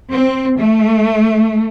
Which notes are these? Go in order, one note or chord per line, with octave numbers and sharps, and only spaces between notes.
C4
A3